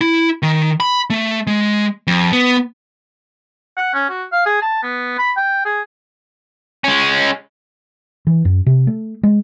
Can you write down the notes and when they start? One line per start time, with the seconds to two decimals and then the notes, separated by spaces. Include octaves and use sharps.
0.01 E4
0.43 D#3
0.80 B5
1.10 A3
1.47 G#3
2.07 F2
2.33 B3
3.77 F#5
3.94 C#4
4.10 F#4
4.32 F5
4.46 G#4
4.62 A5
4.83 B3
5.19 B5
5.37 G5
5.65 G#4
6.84 G#3 C#4
8.27 E3
8.45 F#2
8.67 C3
8.87 A3
9.23 G#3